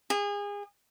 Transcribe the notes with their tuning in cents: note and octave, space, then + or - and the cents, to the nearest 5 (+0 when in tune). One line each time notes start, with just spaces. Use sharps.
G#4 -30